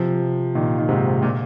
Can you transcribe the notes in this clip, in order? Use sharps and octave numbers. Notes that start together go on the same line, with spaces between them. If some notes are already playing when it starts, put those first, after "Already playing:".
Already playing: C3 F3
A#2 D#3
D#3
G#2 C3
A#2